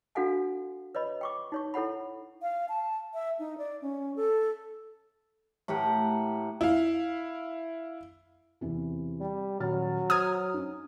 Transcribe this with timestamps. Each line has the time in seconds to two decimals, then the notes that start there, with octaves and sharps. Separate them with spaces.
0.15 D4 F#4 A4 F5 F#5 G#5
0.95 B4 C#5 D#5 B5
1.21 G5 C#6 D6
1.52 D#4 C#5 C#6
1.74 E4 A4 C#5 F#5 B5
2.42 F5
2.69 A5
3.14 E5
3.39 D#4
3.58 D5
3.82 C#4
4.16 A4
5.68 A2 G4 A#4 F#5
6.61 E4 F5
8.61 E2 C3 E3
9.20 G3
9.60 D#1 F#3 F6 A6
10.10 C5 A#5 D#6 F6 G#6
10.54 C#4 D#4